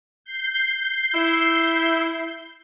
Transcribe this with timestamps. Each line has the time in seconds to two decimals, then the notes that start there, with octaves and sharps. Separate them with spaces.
0.25 G6 C7
1.13 E4